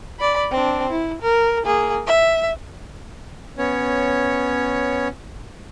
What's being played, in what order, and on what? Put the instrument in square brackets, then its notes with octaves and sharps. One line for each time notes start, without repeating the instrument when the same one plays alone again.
[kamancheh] D5 B5
C4 D4
E4
A#4
A#3 G#4
E5
[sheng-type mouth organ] B3 C#4 C#5